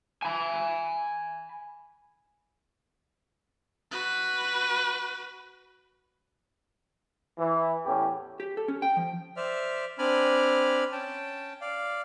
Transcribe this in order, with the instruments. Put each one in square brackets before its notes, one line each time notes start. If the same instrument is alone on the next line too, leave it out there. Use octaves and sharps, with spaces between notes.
[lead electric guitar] G#5 B5
[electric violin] F#4 B4
[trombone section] E3
E2 A2 C#4 G4
[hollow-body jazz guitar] G4
A4
C#4
G5
F3
[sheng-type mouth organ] C5 D5 E5 F6
C4 D4 D5 G#5 B5 F6
C#4 G5 A5
D5 F5